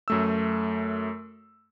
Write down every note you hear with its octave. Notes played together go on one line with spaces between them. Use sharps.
F#2 A3 E6